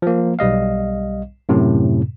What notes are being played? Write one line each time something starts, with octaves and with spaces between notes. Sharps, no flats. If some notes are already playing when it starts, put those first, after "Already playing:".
F3 A#3
B1 G3 D#5 F5
F#2 A2 C3